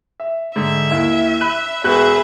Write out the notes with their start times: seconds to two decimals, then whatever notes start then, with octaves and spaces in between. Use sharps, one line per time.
0.20 E5
0.56 G#2 D3 E5
0.91 D#2 E4
1.40 B5 F#6 D#7
1.84 E1 F#4 G#4 B4 E5 F#6